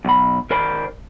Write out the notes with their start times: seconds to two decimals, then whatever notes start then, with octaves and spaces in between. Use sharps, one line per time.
0.05 B1 B5
0.50 D#3 A#4 C5 D5 B5